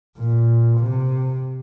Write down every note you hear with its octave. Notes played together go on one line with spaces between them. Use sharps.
A#2
C3